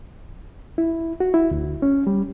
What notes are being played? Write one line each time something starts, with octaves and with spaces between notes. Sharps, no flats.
E4
F#4
E4
D2
C#4
G3